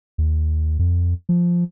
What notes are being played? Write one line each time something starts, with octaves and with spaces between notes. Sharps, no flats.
D#2
F2
F3